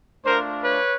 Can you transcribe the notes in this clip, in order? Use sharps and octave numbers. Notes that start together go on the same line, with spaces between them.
A3 D4 F4 A#4 C5
B4 C#5